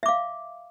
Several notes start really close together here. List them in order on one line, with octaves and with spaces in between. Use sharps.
E5 D6 F5